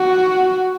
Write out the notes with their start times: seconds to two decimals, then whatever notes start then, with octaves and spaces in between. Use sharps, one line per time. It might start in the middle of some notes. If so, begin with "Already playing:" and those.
Already playing: F#4